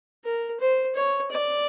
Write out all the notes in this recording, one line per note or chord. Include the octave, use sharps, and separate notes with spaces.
A#4
C5
C#5
D5